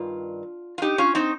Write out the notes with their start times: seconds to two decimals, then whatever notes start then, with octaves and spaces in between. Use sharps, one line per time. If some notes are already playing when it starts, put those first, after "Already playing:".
Already playing: G2 D#3 F4
0.78 F4
0.82 D#4 G4
0.98 C#4 F4
1.15 C4 D#4